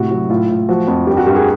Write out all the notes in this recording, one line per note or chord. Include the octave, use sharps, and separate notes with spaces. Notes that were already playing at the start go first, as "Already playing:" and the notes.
Already playing: A2 C3 F#4
F#3
A2 F4
A2
F3 F#4
F2
G2 G4
F#4
G2 G4
G#4